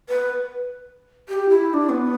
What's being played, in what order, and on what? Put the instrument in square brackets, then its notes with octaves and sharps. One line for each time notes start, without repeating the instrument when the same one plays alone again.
[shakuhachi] B4
G4
E4
E4
D4
B3